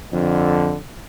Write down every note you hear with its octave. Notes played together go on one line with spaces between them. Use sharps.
F2 D3